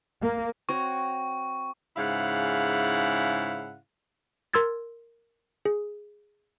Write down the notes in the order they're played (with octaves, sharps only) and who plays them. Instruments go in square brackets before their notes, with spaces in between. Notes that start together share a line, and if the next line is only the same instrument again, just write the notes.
[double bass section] A#3
[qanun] C4 F#4 C#5 [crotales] C#6
[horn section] G#2 C#3 E4 F5 F#5
[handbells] A#4 C6 E6 G#6 A6
G#4